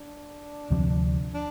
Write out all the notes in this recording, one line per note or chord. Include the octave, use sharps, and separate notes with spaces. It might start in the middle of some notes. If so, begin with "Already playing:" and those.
Already playing: D4
D2 C3 F3 C4
D4